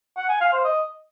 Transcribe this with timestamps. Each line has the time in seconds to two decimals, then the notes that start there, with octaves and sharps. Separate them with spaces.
0.17 F#5
0.29 G#5
0.41 F5
0.53 C5
0.65 D#5